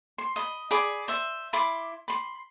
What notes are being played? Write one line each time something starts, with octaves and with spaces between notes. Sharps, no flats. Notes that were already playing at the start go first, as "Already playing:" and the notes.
C6
D#5 B5
G#4 D5 B5
C5 E5
E4 B5 C6 D6
B5 C6